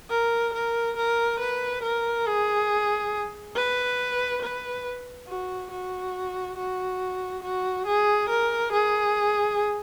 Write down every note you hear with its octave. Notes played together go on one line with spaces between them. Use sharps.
A#4
A#4
A#4
B4
A#4
G#4
B4
B4
F#4
F#4
F#4
F#4
G#4
A#4
G#4